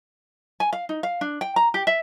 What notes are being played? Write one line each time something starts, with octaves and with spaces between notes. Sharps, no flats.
G#5
F5
D#4
F5
D4
G5
A#5
G4
E5